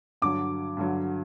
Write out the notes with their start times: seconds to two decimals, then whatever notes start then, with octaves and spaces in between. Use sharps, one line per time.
0.22 G2 D3 F#3 D6
0.77 G2 D3 F#3